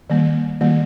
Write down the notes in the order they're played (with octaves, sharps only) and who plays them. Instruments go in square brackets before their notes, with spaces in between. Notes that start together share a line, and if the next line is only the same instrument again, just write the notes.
[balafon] D#3 G3 A#3
D#3 G3 A#3